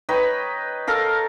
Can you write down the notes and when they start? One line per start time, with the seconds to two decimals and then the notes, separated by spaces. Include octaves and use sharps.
0.09 D#4 B4 C#5 G5
0.87 A4 A#4 F5